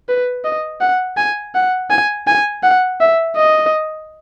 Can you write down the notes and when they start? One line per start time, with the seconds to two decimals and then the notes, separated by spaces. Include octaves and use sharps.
0.09 B4
0.44 D#5
0.81 F#5
1.17 G#5
1.55 F#5
1.90 G#5
2.27 G#5
2.63 F#5
3.00 E5
3.37 D#5